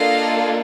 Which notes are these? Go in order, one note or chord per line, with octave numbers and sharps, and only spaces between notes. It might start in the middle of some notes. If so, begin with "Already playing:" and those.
Already playing: A#3 D4 F4 A4 D#5 F5